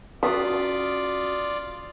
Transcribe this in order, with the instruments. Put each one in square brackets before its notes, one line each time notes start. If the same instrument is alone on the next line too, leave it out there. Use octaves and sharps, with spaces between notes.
[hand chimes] C#4 F#4 B6 [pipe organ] F4 D5 [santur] D#6